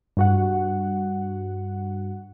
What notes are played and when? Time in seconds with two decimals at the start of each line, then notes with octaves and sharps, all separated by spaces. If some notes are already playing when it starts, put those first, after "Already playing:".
0.17 G2 F#4 F#5